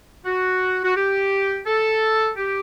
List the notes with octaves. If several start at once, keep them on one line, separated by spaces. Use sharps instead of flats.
F#4
F#4
G4
A4
G4